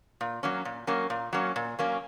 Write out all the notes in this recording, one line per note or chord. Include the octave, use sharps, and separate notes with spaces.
A#2
F#3 A#3 C#4
A#2
F#3 A#3 C#4
A#2
F#3 A#3 C#4
A#2
F#3 A#3 C#4